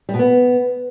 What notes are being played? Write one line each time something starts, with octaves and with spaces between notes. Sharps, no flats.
G3
B2
B3